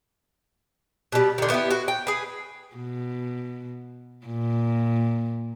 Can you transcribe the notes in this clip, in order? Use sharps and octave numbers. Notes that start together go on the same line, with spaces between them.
B2 G3
D3 D#3
B3 E4 G4
F#4
G5
G#4 B4
B2
A#2